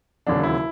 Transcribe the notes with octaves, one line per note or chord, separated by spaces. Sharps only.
E1 D#2 C#3 F#3 D4
E4